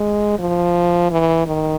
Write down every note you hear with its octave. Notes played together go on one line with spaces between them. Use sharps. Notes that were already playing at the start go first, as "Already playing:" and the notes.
Already playing: G#3
F3
E3
D#3